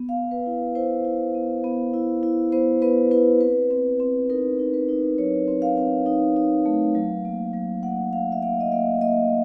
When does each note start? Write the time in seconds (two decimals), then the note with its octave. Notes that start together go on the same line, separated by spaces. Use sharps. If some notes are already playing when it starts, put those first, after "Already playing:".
Already playing: B3
0.09 F5
0.17 B3
0.31 B4
0.46 E4
0.75 E4 C5
1.05 E4
1.35 B3
1.64 B3
1.94 E4
2.23 E4
2.52 B3 C5
2.82 B3 B4
3.11 E4 B4
3.41 C4 B4
3.71 C4
4.00 C4
4.30 D#4 A#4
4.59 D#4
4.74 B4
4.89 D#4
5.18 F#3 C#5
5.48 C4
5.62 F5
5.77 C4
6.06 D#4
6.36 D#4
6.66 A3
6.95 F#3
7.25 A#3
7.53 F#3
7.83 A#3 F#5
8.13 F#3 F5
8.32 E5
8.42 A#3 F5
8.60 D#5
8.72 A#3 E5
9.01 A#3 D#5